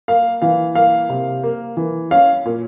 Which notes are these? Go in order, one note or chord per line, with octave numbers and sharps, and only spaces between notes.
A#3 F5
E3 F5
A#3 F5
C3
A#3
E3
C#4 F5
A#2